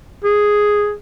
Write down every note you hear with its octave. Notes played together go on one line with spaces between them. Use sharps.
G#4